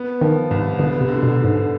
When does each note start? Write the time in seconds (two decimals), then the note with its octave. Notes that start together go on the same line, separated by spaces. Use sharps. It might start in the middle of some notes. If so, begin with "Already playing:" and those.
Already playing: B3
0.21 D#3 F3
0.51 C2 G#2
0.79 D3 B3
1.01 C3
1.08 D3
1.23 B2
1.36 D3
1.44 G#2